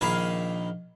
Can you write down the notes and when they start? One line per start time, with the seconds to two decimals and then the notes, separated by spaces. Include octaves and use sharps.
0.01 A#1 D#3 A#3 G#4 F5 B5